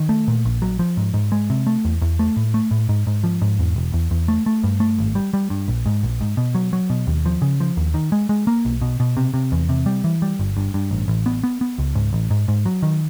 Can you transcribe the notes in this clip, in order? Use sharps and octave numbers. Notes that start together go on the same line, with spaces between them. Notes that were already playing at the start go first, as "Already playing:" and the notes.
Already playing: D#3
A3
A#2
A#1
F#3
F3
G#2
G#2
G#3
C3
A3
E2
E2
A3
A2
A3
A2
G#2
G#2
F3
G#2
E2
E1
E2
E2
A3
A3
G2
A3
G#1
G3
G3
G2
A#1
G#2
A#1
G#2
B2
F#3
F#3
B2
D#2
F3
C#3
F3
D#2
D#3
G#3
G#3
A#3
B1
B2
B2
C3
C3
E2
C3
G3
E3
G3
G1
G2
G2
A1
A1
B3
B3
B3
C#2
G#2
A1
G#2
G#2
F#3
D#3